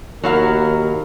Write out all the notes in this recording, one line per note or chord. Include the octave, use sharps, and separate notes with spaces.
D#2 F#3 E4 A#4 F5